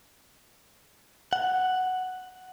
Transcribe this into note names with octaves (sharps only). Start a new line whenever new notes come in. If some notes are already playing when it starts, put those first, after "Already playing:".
F#5